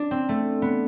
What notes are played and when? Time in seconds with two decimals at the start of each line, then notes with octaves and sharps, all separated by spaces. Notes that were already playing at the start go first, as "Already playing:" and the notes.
Already playing: D4
0.11 C4
0.29 A3
0.62 B3